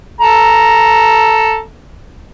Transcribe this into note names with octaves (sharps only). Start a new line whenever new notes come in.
A4 A#5